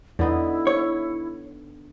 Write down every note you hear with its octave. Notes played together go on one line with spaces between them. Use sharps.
E2 D3 B3 D#4 E4
C#5